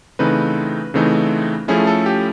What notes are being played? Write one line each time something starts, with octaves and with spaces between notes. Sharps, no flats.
C#3 E3 A3 C4 D#4 B4
C#3 E3 A3 C4 D#4
F3 A3 C#4 E4 G#4
A4
G4